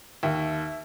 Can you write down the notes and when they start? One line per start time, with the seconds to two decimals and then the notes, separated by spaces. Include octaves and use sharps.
0.23 D#2 E5